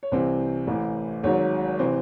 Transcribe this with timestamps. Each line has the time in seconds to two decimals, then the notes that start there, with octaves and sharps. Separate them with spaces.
0.03 C#5
0.12 C2 C3 E3 C5
0.67 A1 A2 E3
1.23 G#1 G#2 F#3 C#5
1.79 C3 E3 C5